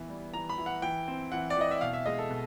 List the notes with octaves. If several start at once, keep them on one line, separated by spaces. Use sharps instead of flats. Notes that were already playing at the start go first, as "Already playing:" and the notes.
Already playing: E3 B3
G3
E3 A#5
B5
E3
F#5
E3 G5
C4
E3 F#5
D5
E3 D#5
E5
B2 F5
E5
G#3 D#5
A4
B2